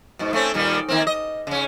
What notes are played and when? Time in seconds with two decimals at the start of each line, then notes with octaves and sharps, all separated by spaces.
0.19 G#2 B2
0.33 A3 C4 C#4
0.54 A#2 D#3 G3
0.88 D#3 A#3 C4
1.07 D#5
1.47 C#3 C#4